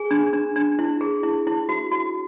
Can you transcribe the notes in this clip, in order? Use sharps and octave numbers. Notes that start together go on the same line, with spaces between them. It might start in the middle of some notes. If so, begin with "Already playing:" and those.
Already playing: G#4 G#5
D4
D4
D4
E4
G#4
E4
E4
F#4
F#4